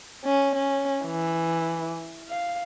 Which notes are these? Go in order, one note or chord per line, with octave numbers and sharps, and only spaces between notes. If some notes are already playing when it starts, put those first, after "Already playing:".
C#4
C#4
E3
F5